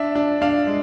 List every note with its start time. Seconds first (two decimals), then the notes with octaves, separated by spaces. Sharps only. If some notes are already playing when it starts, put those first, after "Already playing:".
Already playing: D4 E5
0.15 D4
0.42 D4 F5
0.67 G#3